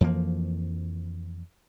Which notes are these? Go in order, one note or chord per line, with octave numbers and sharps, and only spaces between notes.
F2 E3 F3 A#3